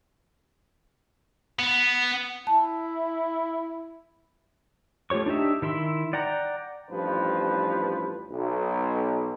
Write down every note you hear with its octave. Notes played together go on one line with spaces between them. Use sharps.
B3
E4 A5
A3 F4 G4 C#5 C#6
D4 D#4 G4 E5
D#3 E4 E5 C6
D5 F#5 G5 A#5
A1 G2 F3 B4
B1